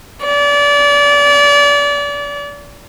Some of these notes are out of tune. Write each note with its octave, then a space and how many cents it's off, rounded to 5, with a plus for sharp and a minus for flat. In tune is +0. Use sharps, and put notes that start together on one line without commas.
D5 -30